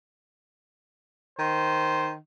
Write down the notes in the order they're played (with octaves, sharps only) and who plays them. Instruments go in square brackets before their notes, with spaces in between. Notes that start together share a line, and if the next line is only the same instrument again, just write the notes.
[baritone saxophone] D#3 [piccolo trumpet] C5